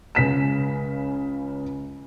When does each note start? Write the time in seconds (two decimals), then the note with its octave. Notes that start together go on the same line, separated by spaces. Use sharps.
0.15 C#2 C#3 B6 E7